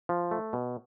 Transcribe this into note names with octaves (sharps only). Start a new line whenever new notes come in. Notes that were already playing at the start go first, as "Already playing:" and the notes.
F3
A3
B2